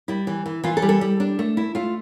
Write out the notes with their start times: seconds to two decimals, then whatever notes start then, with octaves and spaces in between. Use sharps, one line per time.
0.08 G3 E4
0.27 E3
0.46 E3
0.64 E3 F4
0.77 A4
0.82 G3
0.89 A4
1.01 G3
1.20 D4
1.39 A3
1.57 E4
1.75 A3 F4